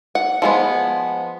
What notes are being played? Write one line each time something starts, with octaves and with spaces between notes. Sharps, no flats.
F#5
F3 G#3 B3